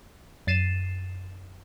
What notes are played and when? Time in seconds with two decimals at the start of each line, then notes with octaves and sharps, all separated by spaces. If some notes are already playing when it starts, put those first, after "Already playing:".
0.47 F#2 A6 C7 D#7 E7